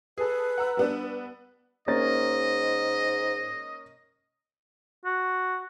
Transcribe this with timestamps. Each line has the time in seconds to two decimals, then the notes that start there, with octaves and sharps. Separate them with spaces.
0.18 G#4 A4 B4
0.58 F#5 A#5 E6
0.77 G3 B3 D4
1.88 G#2 A#3 C#4 D#5 A6
5.05 F#4